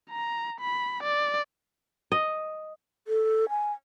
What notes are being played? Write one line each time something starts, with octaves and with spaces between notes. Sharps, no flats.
A#5
B5
D5
D#5
A4
G#5